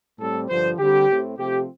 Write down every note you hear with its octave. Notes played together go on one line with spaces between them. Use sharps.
A2 G3 C4 A4
G2 D3 F3 C5
D3 G3 C4 G4
A2 A3 C4
C3 F3 A3 C4 G4